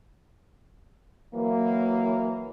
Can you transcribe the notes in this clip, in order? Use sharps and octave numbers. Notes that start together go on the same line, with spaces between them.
E3 F#3 A#3